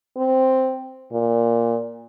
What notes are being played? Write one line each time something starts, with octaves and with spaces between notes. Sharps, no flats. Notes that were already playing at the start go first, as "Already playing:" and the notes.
C4
A#2